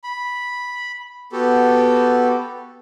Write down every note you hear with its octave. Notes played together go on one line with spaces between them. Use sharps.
B5
B3 F#4 G4 A4